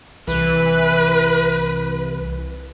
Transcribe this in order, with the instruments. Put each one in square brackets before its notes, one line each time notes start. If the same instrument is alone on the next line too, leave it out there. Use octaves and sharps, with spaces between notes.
[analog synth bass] C2 [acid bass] E3 [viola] B4